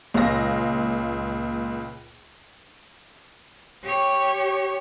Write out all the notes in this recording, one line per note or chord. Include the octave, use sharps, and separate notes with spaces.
C#2 A#2 F5 A#6
G4 C#5